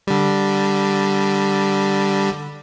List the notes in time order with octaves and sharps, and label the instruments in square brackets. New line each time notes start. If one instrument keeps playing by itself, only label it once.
[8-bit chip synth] D3 G3